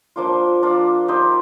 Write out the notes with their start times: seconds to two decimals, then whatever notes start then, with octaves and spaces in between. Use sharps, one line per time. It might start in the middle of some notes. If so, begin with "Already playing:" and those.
0.16 F3 A#3 D4 F4
0.62 F3 A#3 D4 F4
1.08 D#4 G4 C5 D#5